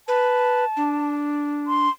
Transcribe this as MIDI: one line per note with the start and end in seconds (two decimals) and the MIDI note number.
0.08 0.65 71
0.08 1.15 81
0.77 1.88 62
1.67 1.90 84